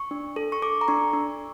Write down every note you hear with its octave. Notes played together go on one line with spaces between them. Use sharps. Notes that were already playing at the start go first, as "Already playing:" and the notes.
Already playing: C#6
D4
A4
C#6
A4 D6
A#5
D4 C#6
D4